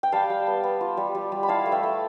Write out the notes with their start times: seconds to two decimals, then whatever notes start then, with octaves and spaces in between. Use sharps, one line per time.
0.03 G5
0.12 G3 F5 A5
0.30 G3
0.47 B3
0.64 B3
0.81 F4
0.97 G3
1.15 G3
1.32 G3
1.43 B5
1.48 E4 F5 A5
1.66 A3
1.72 E5 G5
1.83 A3